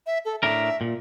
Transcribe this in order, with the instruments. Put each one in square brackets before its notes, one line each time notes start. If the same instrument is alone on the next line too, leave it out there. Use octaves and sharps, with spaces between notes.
[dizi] E5
A4
[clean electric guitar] A2 D4 A#4 [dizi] E5
[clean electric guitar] A#2